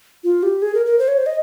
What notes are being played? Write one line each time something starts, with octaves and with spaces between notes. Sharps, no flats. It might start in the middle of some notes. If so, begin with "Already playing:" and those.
F4
G4
G#4
A#4
A#4
C5
C#5
C5
D#5